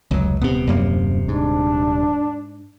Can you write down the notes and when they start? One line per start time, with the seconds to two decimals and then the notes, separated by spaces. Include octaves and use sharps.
0.11 F1 C#2 F#3
0.41 D#1 C3 B3
0.67 A#1 F#2 A#3
1.28 G#2 D4